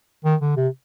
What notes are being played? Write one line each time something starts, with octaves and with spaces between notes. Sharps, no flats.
D#3
D3
C3